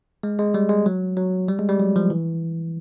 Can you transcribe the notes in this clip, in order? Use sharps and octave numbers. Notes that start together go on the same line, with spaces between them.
G#3
G#3
G3
G#3
F#3
F#3
G3
G#3
G3
F#3
F3
E3